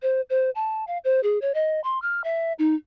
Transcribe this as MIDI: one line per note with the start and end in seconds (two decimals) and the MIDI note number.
0.02 0.21 72
0.30 0.50 72
0.55 0.84 81
0.87 0.98 77
1.04 1.21 72
1.23 1.39 68
1.42 1.52 73
1.54 1.80 75
1.84 2.01 84
2.02 2.22 89
2.24 2.53 76
2.59 2.75 63